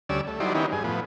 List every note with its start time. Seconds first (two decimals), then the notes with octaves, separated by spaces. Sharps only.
0.09 D2 G3 C#4 D5 E6
0.27 A3
0.40 F#3 G3 D#4 E4 C5 D5
0.55 D#3 B3 C#4 D#4 E4 G4
0.72 G2 G#4
0.84 A2 F3 B3